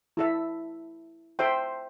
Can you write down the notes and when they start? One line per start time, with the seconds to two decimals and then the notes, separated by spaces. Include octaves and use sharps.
0.17 E4 A4 E5
1.39 A4 C5 E5 G5 C6